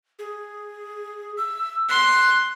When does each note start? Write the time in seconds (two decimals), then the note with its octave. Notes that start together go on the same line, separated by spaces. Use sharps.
0.19 G#4
1.37 E6
1.89 C6 F#6